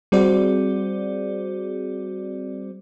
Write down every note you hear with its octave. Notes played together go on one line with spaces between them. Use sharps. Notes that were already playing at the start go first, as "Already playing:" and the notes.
G3 C4 F#4 G#4 C5 D5